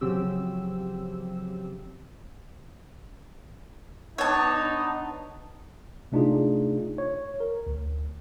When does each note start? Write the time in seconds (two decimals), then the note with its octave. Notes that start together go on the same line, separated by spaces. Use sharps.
0.01 C#3 F3 F#3 C4 G4 E6
4.18 B3 D4 D#4 C#5 A5
6.12 C3 A3 D4 D#4 F4 G#4
6.98 C#5
7.40 A#4
7.67 D2